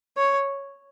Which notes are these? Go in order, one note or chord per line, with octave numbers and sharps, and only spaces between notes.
C#5